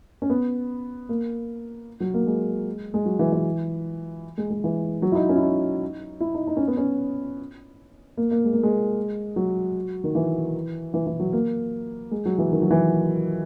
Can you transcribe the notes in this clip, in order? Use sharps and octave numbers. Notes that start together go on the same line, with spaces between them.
C#4
B3
A#3
F#3
A#3
G#3
G#3
F#3
E3
E3
G#3
G#3
E3
F#3
E4
D#4
C#4
E4
D#4
E4
D#4
D#4
C#4
B3
C#4
A#3
A#3
G#3
A#3
G#3
F#3
D#3
E3
E3
E3
F#3
A#3
G#3
F#3
E3
D#3
F#3
E3